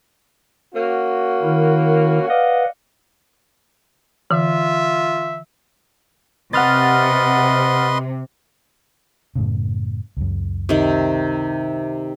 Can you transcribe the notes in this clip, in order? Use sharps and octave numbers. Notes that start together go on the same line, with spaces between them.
A#3 C#4 F#4
D#3 E4 A#4
B4 D5 D#5 F5 F#5
D3 E3 F4 E5
C3 B4 D#5 F#5 C6 F6 A6
F#2 A2 C#3
C#2 F#2
C3 D#3